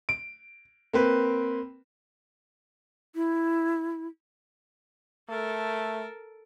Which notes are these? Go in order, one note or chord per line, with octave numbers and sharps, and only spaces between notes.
D7
A#3 C4 B4
E4
A3 A4 A#4